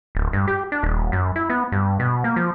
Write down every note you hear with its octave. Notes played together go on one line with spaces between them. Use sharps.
D1
G2
G4
D4
D#1
F#2
E4
B3
G2
B2
A#3
F3